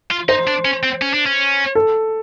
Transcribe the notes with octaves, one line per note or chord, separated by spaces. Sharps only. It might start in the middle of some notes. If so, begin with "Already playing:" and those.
F4
D#4 C5
D4
C#4
C4
C#4
D4
C#4
A4